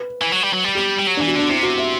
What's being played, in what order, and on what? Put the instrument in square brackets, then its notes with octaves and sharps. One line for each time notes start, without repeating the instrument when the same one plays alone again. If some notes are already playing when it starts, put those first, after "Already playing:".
Already playing: [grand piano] B4
[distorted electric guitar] E3
F#3
G3
F#3
G3
[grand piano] G4
[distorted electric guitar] G3
F#3
[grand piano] D4
[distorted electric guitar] E3
[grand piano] F#4
[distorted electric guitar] D3 [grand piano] D4
[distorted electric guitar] C3 [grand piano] E4
[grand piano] F#4
E5